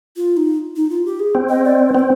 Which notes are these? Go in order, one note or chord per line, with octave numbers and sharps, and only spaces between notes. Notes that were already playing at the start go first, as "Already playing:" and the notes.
F4
D#4
D#4
F4
G4
G#4
C4
D#5
D5
C5
B4
C4 C5